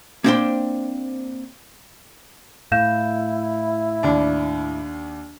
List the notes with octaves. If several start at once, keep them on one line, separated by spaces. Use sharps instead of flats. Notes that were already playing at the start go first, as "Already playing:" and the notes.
A#3 C4 D4 C5 G5 C6
A2 E4 F5 G6 E7
D#2 D4